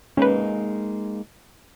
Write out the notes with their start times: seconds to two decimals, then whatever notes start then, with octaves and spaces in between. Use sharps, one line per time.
0.17 G#3 A#3 C#4 D#4 B4